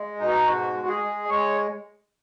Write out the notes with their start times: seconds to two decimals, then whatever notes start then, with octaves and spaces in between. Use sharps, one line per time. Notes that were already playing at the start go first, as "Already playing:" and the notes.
Already playing: G#3
0.20 B2 D#4
0.46 G#2 F#4
0.73 G#3
0.87 G#4
1.01 G#3
1.29 G#3 C#5